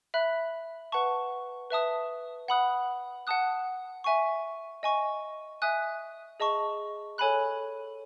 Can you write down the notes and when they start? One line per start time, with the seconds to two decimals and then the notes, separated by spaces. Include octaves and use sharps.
0.14 E5 B5 F#6
0.92 B4 F#5 A5 C#6
1.70 B4 E5 A5 D#6
2.48 F#5 B5 D#6 F#6
3.27 F#5 A5 D#6 F#6
4.04 E5 G#5 C#6
4.83 D#5 G#5 C#6
5.62 E5 G#5 D#6 F#6
6.40 G#4 D#5 A5 C#6
7.18 A4 C#5 G#5 B5 F#6